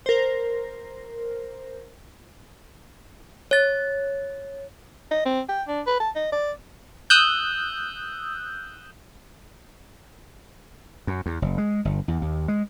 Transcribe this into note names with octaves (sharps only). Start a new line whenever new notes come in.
A#4 C5
C#5 A6
D#5
C4
G5
D4
B4
A5
D#5
D5
D#6 E6 F#6 G6
F#2
E2
F#1
G#3
G1
E2
D#2
G#3